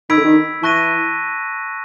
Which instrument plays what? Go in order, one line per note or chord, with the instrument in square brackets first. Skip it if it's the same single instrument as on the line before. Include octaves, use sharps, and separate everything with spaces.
[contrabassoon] D#3 [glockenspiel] B5 E6 G#6 B6 D7
[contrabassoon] D3
D#3
[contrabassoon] E3 [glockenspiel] A5 C#6 F#6 A#6 D#7